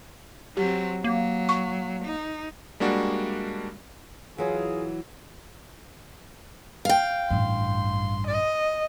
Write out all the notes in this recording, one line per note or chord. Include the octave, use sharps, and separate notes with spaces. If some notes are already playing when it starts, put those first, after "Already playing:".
F#3 C4 G4
F#3 A#3
C#6
D#4
G3 G#3 A#3 D4 F#4
E3 F#3 F4 G#4
F5 G5
A1 G2 C6
D#5